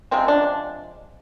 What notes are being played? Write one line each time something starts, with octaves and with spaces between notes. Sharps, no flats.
C3 F3 G#3 C4
D4